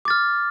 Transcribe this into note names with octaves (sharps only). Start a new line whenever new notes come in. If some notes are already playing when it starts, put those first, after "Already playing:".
D6 F6 A6